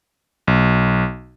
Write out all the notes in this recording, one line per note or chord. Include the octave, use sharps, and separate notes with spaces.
B1